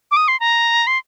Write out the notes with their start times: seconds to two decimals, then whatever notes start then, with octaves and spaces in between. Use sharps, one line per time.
0.11 D6
0.17 D#6
0.28 C6
0.40 A#5
0.87 C6